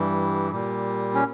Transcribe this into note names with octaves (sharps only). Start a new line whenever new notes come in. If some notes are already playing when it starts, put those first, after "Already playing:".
Already playing: G2 E3 G3
A#2 G3
C#4